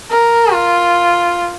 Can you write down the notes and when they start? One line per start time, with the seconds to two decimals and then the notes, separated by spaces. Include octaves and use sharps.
0.10 A#4
0.52 F4